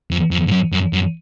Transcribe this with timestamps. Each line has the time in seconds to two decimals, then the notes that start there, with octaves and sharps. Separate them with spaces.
0.11 F2
0.31 F2
0.47 G#2
0.52 F#2
0.72 F#2
0.93 F#2